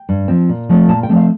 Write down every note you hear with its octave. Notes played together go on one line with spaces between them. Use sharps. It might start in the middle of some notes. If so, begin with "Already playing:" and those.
Already playing: G5
G2
F3 C4
A#2
F3 A3 C4
A#2 A5
G5
F3 A3 C4
F5